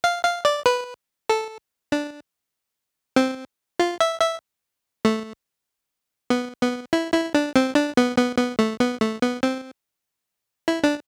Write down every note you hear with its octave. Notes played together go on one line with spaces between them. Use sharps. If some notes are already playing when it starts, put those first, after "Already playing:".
F5
F5
D5
B4
A4
D4
C4
F4
E5
E5
A3
B3
B3
E4
E4
D4
C4
D4
B3
B3
B3
A3
B3
A3
B3
C4
E4
D4